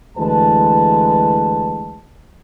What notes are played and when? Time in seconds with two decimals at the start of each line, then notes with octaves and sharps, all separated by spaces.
0.17 D2 E3 G#3 B4 A5